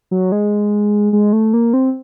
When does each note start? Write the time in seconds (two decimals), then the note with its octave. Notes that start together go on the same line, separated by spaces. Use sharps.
0.11 F#3
0.32 G#3
1.13 G#3
1.33 A3
1.54 A#3
1.73 C4